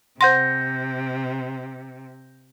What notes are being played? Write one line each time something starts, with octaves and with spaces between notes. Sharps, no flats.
C3 C5 F#5 C6 G6 A#6